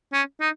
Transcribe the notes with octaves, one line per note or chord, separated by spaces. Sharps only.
C#4
D#4